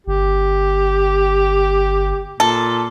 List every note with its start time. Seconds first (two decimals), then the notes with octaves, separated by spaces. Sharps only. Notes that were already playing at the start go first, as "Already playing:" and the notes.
0.07 G1 G4
2.40 A#2 A4